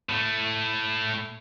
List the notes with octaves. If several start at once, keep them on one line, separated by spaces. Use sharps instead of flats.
A2 A3